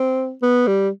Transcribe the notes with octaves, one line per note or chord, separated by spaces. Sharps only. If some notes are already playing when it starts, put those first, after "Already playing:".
Already playing: C4
B3
G3